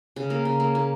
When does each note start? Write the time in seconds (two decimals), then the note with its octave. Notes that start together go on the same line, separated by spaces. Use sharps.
0.16 C#3
0.30 A#3
0.45 C#3
0.60 A#3
0.75 A#3